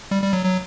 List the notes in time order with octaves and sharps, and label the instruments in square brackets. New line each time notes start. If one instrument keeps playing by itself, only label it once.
[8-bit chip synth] G3
G3
F#3
F#3